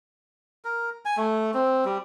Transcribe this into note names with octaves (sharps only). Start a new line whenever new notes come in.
A#4
G#5
A3
C4
G3